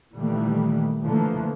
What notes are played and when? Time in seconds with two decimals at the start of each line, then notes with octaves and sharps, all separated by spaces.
0.15 A#2 D#3 E3 G3 A3 A#3
1.05 D3 E3 F3 A3 A#3